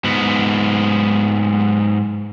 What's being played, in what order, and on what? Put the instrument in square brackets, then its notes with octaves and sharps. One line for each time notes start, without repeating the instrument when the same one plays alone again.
[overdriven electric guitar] G#2 B3